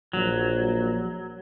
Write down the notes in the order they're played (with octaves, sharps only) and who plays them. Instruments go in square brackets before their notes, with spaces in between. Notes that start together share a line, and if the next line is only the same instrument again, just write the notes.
[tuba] A#1 [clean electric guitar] F#3